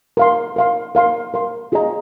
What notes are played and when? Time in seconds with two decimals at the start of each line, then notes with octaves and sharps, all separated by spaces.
0.17 A#4 F5 C6
0.56 A#4 F5 C6
0.95 A#4 F5 C6
1.34 A#4 F5 C6
1.72 F4 G#4 D#5 A#5